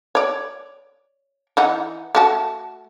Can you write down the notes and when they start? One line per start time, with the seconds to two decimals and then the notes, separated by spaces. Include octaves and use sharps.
0.15 C#5 D5
1.57 E3 D#4 F#5
2.15 A3 F#4 A5